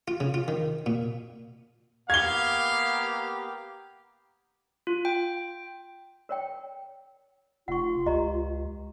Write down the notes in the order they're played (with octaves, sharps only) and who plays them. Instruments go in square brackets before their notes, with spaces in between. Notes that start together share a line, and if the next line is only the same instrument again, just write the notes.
[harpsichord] F4
C#3
F4
D#3
A#2
[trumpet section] A#3 B3 G4 [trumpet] F5 [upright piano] G#6 G7
[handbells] F4
G5
[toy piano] A#4 C#5 G5
[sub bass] F1 [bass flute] F4 [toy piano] F#5 C#6
[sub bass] C#2 [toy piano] G4 D#5 A#5